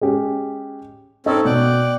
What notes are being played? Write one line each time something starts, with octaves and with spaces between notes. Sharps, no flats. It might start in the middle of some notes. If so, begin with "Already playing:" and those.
G#3 C#4 G4
C4 C#4 D#4 A4
B2 D5 F#5 G5